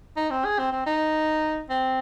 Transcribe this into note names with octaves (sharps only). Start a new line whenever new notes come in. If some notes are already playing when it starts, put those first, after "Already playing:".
D#4
C4
G#4
C4
C4
D#4
C4